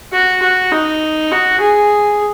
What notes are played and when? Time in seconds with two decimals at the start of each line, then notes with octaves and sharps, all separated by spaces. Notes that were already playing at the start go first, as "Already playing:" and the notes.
0.12 F#4
0.42 F#4
0.71 D#4
1.31 F#4
1.60 G#4